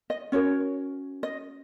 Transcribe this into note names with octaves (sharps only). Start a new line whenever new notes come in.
D#5
C#4 F#4 A#4 C#5
D#5